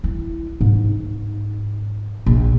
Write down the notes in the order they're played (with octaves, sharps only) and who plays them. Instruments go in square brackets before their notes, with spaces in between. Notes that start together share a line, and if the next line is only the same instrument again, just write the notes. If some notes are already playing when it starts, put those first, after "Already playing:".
[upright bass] E4
G#2
A#1